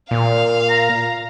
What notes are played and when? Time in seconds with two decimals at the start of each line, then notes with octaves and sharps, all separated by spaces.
0.11 A#2 F5
0.70 A#5